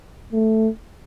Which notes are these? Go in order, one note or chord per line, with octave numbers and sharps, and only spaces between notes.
A3